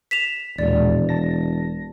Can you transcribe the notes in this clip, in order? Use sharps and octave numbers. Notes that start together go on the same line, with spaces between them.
B6 E7 F7
E1 D#2 A#2 G#3 D5
A5 A#6